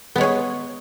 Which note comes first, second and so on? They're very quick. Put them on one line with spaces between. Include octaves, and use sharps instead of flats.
B3 G#3 C#5 G#4